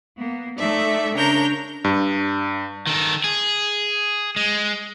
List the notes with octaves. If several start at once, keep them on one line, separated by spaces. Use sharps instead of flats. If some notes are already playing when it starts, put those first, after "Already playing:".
A#3 B3
A3 D#4 A4 D5 E5
C#3 D4 A#4 C#5 A#5 G6
G2
D#3 A4
G#4
G#3